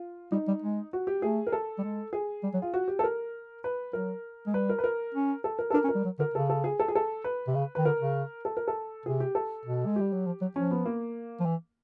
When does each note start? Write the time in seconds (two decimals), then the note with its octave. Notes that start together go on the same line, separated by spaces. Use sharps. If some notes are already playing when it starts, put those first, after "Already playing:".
Already playing: F4
0.32 G3 D#4
0.48 G3
0.62 G#3
0.93 F#4
1.07 G4
1.22 A3 G#4
1.47 A#4
1.52 A4
1.78 G3
1.83 G#3
2.13 G#4
2.43 G3
2.54 F#3
2.62 F4
2.74 F#4
2.88 G4
2.99 A4
3.04 A#4
3.64 B4
3.93 F#3 A#4
4.47 G#3
4.54 G3 B4
4.69 A#4
4.79 B4
4.84 A#4
5.14 C#4
5.44 A4
5.59 A#4
5.70 A4
5.74 D4 A#4
5.84 C#4
5.89 A#4
5.95 G3
6.05 F#3
6.19 D3 A#4
6.34 C#3 A4
6.50 A4
6.64 G#4
6.80 A4
6.88 G#4
6.95 A4
7.24 B4
7.47 C3
7.55 C#3
7.75 D#3 B4
7.85 D3 A#4
8.00 C#3
8.45 A4
8.57 A#4
8.68 A4
9.06 C3 G#4
9.20 G4
9.35 A4
9.65 B2
9.86 G#3
9.96 G3 G4
10.12 F#3
10.26 F3
10.42 F#3
10.56 F3 C#4
10.71 B3
10.85 A#3
11.40 F3
11.46 E3